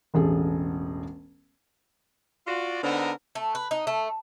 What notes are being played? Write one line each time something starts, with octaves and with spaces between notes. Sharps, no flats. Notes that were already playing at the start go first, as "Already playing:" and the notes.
E1 A1 G#4 A4
F4 F#4 D5
D3 B3 C4 D4 D#4 A#4
A3
B4
D#4
A3